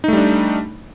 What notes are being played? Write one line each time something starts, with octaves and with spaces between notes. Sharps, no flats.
G3 A3 D4 D#4